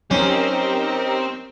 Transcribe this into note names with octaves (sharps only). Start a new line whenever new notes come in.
F#3 C4 C#4 D#4 G4 A#4 C5